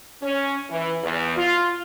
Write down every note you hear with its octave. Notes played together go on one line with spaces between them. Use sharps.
C#4
E3
E2
F4